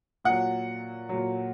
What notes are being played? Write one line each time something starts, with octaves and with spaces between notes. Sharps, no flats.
A#2 F#3 F#5
A#2 F#3